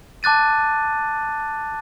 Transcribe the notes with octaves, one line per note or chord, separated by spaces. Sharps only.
A5 D6 F#6 A6 D#7